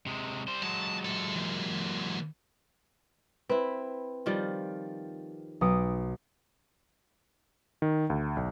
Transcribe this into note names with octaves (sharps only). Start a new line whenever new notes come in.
C3 G#3
G3 C5
F#3 G#3 A5
E4 A4
E3 A#3
C4 E4 B4
D#3 F3 G3
B1 D#6 D7
D#3
D2
B1